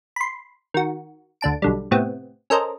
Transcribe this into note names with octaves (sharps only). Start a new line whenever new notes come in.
B5 C6
D#3 F#4
D2 D4 A5 D7
B1 D3 G3
A2 C3 B3 C4
C#4 A4 A#4 C5 D#5